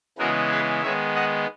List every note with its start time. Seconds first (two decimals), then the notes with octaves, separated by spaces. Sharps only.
0.18 C#3 E3 G#3 B3 F#4 A#4
0.51 G#4 B4
0.83 D#3 G#3 B3 C#5 E5
1.15 D#5 F#5